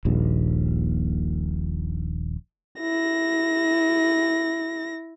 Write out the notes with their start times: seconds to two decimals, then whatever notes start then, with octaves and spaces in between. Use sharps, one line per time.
0.05 D#1 A#1 D#2
2.81 E4 A#6